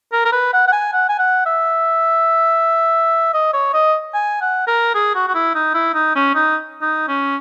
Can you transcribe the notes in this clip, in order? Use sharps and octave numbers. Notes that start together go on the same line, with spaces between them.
A#4
A#4
B4
F#5
F#5
G#5
F#5
G#5
F#5
E5
D#5
C#5
D#5
G#5
F#5
A#4
G#4
F#4
F#4
E4
D#4
E4
D#4
C#4
D#4
D#4
C#4